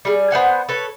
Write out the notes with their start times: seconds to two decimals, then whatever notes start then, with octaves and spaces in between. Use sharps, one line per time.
0.05 G3 G#4
0.31 B3 C5 F#5 G#5
0.69 A4 B4 C#5